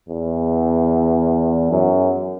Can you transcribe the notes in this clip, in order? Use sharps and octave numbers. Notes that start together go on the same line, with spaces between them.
E2
F#2